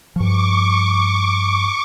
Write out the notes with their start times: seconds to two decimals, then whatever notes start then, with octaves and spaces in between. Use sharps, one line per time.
0.16 G2 F3 C#6 D6